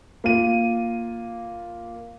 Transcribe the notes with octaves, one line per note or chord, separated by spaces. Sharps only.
A#3 F4 D#7